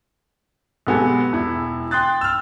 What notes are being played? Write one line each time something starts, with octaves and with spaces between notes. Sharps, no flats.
B1 G#3 B3 G4 A4 G#5
E1 E4
G5 C6 D#6 F#6 A6
E6 F6